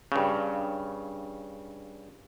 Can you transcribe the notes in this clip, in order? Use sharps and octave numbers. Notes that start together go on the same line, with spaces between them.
G2 C#3